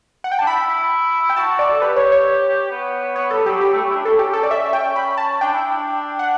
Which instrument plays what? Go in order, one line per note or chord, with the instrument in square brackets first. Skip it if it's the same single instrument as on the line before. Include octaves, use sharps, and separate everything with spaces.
[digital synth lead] F#5
G5
A5
[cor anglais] D4
[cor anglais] E4 [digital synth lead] B5
[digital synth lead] G5
[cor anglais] F#4 [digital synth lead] A5
[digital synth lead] D5
[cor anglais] A4
[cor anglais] G4 [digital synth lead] B4
[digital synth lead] C#5
C#5
[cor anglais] B3
[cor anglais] B3 [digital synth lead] C#5
[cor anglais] G3 [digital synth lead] A4
[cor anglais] F#3 [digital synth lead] G4
[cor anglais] G3 [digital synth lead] G4
[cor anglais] A3
C#4
E4
D4
[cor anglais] C#4 [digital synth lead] A4
[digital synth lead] G4
A4
D5
E5
G5
B5
A5
[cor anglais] D4 [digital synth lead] G5
[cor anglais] E4
D4
[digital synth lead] F#5